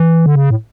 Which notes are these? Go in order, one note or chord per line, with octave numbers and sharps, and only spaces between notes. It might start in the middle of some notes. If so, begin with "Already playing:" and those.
Already playing: E3
D3
C#3
A2